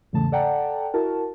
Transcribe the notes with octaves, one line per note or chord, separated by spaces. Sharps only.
E2 G#2 C#3 E3 A3 A5
A4 D5 F#5 G5 A5 A#5
E4 F#4 A#4 A5